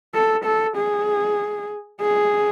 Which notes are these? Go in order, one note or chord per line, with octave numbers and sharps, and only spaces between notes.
A4
A4
G#4
G#4